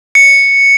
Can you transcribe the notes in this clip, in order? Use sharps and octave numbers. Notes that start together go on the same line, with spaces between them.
C#7